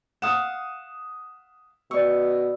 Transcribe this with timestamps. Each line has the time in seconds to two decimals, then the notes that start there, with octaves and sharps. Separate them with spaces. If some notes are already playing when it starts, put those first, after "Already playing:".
0.22 F5 F#5 D#6 E7
1.91 B2 D5 C#6 E6